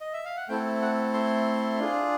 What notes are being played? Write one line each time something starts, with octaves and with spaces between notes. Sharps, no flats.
D#5
E5
F5
F#5
A3 C4 E4 A4 G5
F#5
C6
D4 F4 G#4